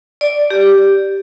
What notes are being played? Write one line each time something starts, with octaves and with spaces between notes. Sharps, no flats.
D5
G4